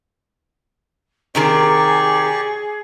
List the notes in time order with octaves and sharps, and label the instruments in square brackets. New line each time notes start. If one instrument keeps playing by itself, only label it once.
[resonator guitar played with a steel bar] C3 D#3 A#4 [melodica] G4 D5 C#6 [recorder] G#4